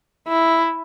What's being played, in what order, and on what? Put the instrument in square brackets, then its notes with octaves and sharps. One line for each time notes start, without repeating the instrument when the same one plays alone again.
[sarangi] E4